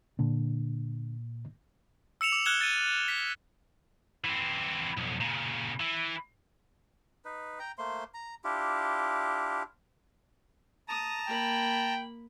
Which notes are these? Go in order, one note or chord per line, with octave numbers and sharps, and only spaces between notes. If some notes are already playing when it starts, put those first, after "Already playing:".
A#2 D3
E6 C#7 E7 F7
D6
F6 F#6 G#6 C#7 E7 G7
A6 D#7
B6
E3 C4
B1 F2
A#2 C#3
E3
D#4 B4
G5 A#5
A3 A#3 C5 C6
A#5
D4 E4 F4 G4
A5 A#5 D#6
A#3 G5 B5